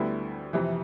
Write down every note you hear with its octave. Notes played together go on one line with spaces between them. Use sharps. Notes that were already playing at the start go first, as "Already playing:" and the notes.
Already playing: D2 D3 G3 B3 E4
F2 C3 E3